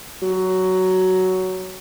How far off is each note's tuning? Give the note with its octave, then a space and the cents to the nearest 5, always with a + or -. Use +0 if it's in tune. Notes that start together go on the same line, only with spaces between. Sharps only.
F#3 +10